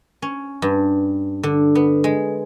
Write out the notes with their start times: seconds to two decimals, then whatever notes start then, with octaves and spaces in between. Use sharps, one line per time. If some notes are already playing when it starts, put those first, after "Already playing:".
0.22 C#4
0.62 G2
1.43 D3
1.75 B3
2.04 G#3